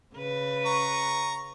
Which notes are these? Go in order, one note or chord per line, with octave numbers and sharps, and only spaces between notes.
C#3 B4
A#5 C#6